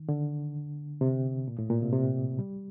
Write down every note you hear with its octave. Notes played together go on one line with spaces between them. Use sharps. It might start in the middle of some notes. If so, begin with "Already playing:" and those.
Already playing: D#3
D3
C3
A#2
A2
A#2
C3
C3
G3